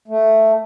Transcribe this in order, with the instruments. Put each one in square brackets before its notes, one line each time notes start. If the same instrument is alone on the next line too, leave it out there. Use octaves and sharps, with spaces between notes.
[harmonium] A3